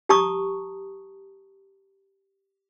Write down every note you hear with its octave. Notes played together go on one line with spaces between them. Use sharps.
G4 A5 A#5 C#6 D#6